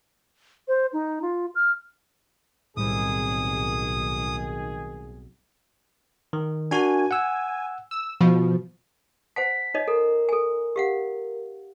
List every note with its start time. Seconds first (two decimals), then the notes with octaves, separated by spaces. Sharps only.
0.68 C5
0.93 D#4
1.22 F4
1.55 F6
2.77 B1 A2 D#3 G3 C4 G#4 D#6
6.33 D#3
6.71 D4 F#4 A#4 G#5
7.11 F#5 E6
7.91 E6
8.21 B2 F3
9.36 C5 F#5 A5 B6
9.74 D#4 C#5 D#5
9.88 A4 A#4
10.29 A4 G#5
10.76 G4 F5 F#5